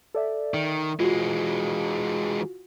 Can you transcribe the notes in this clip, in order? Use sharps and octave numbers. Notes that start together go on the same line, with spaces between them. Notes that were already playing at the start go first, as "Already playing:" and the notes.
A4 D5 E5
D#3
E3 G#3 F4 F#4